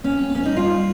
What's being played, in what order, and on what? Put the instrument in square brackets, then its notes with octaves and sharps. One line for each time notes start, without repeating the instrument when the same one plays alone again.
[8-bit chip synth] A#3 [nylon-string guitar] C#4
[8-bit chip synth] C4
A#3
[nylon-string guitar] C#4
[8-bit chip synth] G3 [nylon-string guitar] D#4
[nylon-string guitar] F4